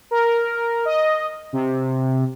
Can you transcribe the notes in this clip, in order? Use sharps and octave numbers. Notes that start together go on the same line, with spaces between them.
A#4
D#5
C3